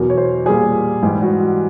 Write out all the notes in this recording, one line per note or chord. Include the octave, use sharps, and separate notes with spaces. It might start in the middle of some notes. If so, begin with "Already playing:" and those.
Already playing: E2 B2 F#3 A#4
C#5
C5
A#2 G3 G#4
G#2 E3 G3 G4
F#4
F#4